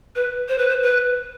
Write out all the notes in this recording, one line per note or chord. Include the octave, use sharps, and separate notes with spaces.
B4
C5
B4
C5
B4